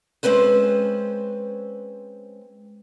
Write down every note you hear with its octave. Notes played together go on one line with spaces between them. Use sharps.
G#3 C4 C#4 B4 C5